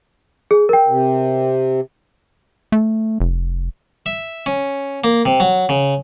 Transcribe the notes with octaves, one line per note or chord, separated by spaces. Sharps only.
G#4
A#4 G5
C3
A3
F1
E5
C#4
A#3
C3
F#3
C#3